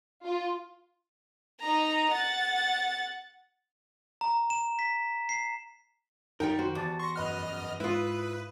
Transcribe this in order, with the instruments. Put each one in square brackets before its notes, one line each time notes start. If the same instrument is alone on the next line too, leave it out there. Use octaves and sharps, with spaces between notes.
[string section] F4
[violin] D#4 A#5
F#5 A6
[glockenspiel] A#5
E7
B6
C7
[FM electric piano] F#2 D#3 [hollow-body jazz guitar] G3 A#4 [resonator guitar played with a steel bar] D#4 G5
[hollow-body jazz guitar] F#4 C5
[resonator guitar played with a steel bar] E2 [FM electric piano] G4 D5 A5
[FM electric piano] C6 [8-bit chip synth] C#6 A#6
[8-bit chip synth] F#2 D#5 F6 [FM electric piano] B4 F#5
[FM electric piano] G#2 D#6 [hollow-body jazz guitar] E4 F4 [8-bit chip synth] B4